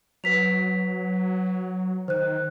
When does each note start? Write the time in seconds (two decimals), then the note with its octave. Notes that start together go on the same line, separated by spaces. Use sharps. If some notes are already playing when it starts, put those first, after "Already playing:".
0.24 F#3 B4 B6 F7
2.08 D#3 C5 F#6